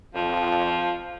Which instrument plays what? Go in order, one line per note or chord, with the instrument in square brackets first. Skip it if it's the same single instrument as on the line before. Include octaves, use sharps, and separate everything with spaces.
[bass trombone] F2 [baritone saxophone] F3